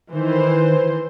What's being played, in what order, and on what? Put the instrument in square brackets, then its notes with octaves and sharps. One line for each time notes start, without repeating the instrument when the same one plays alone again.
[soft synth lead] D#3 [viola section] E3 C5